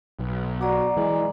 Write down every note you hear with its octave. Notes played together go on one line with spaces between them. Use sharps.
B1
F#4 D5 A#5 D6
E3 G#3